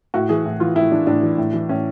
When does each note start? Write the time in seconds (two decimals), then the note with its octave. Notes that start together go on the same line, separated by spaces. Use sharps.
0.14 A2 F#4
0.29 E3 G#4
0.45 A2
0.60 E3 F4
0.76 A2 E4
0.91 E3 D4
1.07 A2 D4
1.23 E3
1.38 A2
1.53 E3
1.69 A2 C#4